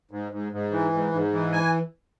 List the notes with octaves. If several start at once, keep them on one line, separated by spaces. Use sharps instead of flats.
G#2
G#2
G#2
E3
G#2
G#2
E3
G#5